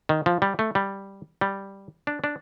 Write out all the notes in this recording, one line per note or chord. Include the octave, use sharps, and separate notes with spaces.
D#3
F3
G3
A3
G3
G3
D4
D4